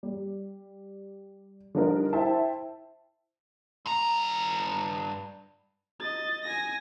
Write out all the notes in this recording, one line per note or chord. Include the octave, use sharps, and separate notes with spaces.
G3
D3 F3 G3 D4 D#4 A#4
E4 C5 E5 G5 A5
G2 A#5
D#5 A6
G#5 A#6